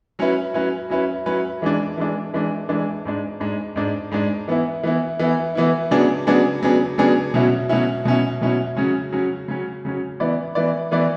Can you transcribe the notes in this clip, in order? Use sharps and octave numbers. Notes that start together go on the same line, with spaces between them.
F#3 C#4 E4 B4
F#3 C#4 E4 B4
F#3 C#4 E4 B4
F#3 C#4 E4 B4
E3 G#3 D4
E3 G#3 D4
E3 G#3 D4
E3 G#3 D4
G#2 G#3 D4
G#2 G#3 D4
G#2 G#3 D4
G#2 G#3 D4
E3 B3 E4
E3 B3 E4
E3 B3 E4
E3 B3 E4
C#3 F#3 B3 D4 G#4
C#3 F#3 B3 D4 G#4
C#3 F#3 B3 D4 G#4
C#3 F#3 B3 D4 G#4
B2 F#3 C#4 E4
B2 F#3 C#4 E4
B2 F#3 C#4 E4
B2 F#3 C#4 E4
C#3 F#3 C#4
C#3 F#3 C#4
C#3 F#3 C#4
C#3 F#3 C#4
E3 B3 E4 B4 D5
E3 B3 E4 B4 D5
E3 B3 E4 B4 D5